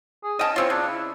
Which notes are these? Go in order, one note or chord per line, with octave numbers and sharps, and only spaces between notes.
G#4
C#4 D#5 G5 A5
E3 C4 F4 C#5
C#3 D4
E4